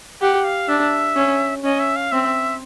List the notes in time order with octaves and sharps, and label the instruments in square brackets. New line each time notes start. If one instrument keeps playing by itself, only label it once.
[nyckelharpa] G4 [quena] F#5
[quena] F5
[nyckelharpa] D4 [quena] E5
[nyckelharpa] C#4
[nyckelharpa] C#4 [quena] D#5
[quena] E5
F5
[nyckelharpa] C4 [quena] E5